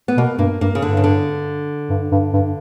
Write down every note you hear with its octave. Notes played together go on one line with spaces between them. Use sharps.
B3
B2 A#3
G2 A#3
G2 A#3
C#3
G2 D3
C#3
D3
G2
G2
G2